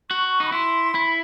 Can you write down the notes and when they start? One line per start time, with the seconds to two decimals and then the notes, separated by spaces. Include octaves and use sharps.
0.10 F#4 C#6
0.40 D#4
0.47 B5
0.52 E4 C6
0.94 E4 B5